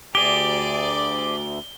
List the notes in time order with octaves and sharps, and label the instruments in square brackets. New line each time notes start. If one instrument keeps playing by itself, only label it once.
[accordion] D2 [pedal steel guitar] G4 G#4 [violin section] D5 D6 [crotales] G7